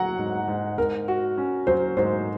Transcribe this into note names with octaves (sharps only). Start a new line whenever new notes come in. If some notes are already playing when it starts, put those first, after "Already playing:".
Already playing: F#3 F#5 A#5
G#2
G#2
G#2 A#4
F#4
C#4
F#3 C5
G#2 C5